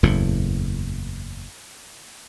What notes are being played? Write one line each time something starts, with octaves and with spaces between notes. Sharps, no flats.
F#1 E2 A2